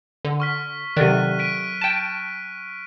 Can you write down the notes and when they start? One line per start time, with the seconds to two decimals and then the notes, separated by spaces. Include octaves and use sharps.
0.25 D3
0.40 C#6 F6 B6
0.97 C3 D#3 F#3 A4 D5 F#6 D#7
1.39 B6 D7 D#7
1.81 G5 A5